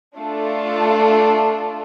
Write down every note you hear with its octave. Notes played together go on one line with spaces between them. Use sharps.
A3 D4 F4 A4